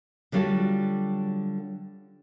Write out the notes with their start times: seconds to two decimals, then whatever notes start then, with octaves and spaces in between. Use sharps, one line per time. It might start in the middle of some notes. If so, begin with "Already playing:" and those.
0.32 D3 F#3 G3 F4 F#4 A4